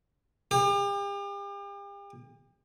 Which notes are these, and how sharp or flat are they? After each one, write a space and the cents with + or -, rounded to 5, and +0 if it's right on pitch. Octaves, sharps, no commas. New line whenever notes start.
G4 +40